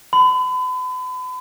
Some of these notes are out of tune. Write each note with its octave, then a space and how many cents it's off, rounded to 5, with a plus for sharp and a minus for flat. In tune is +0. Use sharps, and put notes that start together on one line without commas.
B5 +40